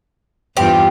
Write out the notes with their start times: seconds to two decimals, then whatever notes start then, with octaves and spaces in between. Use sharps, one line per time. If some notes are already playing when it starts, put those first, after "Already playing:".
0.57 E2 G2 C4 F4 G4